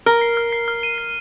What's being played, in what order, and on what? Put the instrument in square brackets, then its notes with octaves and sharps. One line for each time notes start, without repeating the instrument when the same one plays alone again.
[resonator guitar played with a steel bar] A#4 [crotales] F6
[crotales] C7
F6
C7
F6
D#7
C7